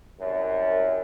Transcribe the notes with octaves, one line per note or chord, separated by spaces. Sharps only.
C2 F#2